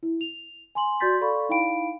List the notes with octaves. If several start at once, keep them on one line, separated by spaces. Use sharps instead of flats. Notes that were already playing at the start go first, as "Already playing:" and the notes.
E4
F7
G#5 C6 F#7
F#4 D5 C6 G6 A6 B6
A4 D5 F5 B5 C#6
D#4 E4 F5 G5 B5 D7